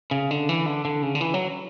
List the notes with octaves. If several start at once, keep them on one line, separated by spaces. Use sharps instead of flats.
C#3
D3
E3
D3
D3
C#3
D3
E3
F#3